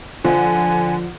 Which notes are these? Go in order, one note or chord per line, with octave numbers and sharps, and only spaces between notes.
D3 F3 G#5